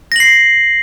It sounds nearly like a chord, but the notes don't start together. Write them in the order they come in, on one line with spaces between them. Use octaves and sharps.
A#6 F#7 C7